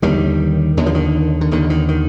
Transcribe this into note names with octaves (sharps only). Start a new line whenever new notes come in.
D#2 D3 D#3 G3
D#2 D3 D#3
F3
D#3
D3
D#2 D3 D#3
D#3
D#3